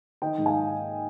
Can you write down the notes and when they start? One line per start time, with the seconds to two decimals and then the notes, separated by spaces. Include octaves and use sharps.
0.22 D#3 D#5 G5
0.38 G#2
0.46 F5 G#5